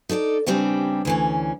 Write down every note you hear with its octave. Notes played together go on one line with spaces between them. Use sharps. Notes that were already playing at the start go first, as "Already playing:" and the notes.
D#4 A4 C#5 D5
D#2 C#3 E3 G3 C4 D4
D2 E3 C#4